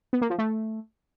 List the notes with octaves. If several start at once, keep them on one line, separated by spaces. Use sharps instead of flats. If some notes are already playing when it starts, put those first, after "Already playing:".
B3
A#3
F3
A3